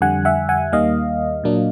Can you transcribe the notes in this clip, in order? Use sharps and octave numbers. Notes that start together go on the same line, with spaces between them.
F2 D3 G3 F#5 G#5
E5 F#5
F#5 G#5
D#2 D#3 G3 A#3 D#5 F5
A#2 F#3 A#3 D4